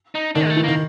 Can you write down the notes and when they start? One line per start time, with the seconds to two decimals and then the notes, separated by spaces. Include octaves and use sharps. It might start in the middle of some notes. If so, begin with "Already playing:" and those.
0.15 D#4
0.35 D#3 D4
0.45 G#3
0.50 A3
0.56 E3
0.64 D#3 A#3